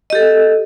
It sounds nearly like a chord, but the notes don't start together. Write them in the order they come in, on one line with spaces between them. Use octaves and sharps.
D#5 G4 A4